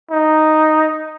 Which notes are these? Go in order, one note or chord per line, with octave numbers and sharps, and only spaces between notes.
D#4